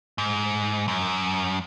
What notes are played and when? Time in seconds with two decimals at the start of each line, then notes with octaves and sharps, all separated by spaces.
0.18 G#2
0.88 F#2